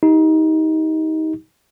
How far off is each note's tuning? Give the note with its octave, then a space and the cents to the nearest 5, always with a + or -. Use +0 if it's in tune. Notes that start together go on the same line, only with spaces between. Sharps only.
D#4 +25 G4 +0